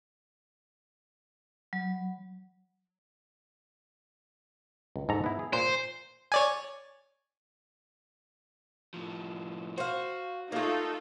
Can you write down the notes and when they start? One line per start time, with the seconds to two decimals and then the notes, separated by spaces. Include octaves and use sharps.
1.73 F#3
4.96 C#2
5.09 G#2 A4 A#5
5.24 B3 E4
5.39 G#4
5.53 A#2 C5
6.32 C#5 D5 G#5
8.94 A2 F3
9.78 F#4 C5 F5
10.52 A3 A#3 D#4 F4 A4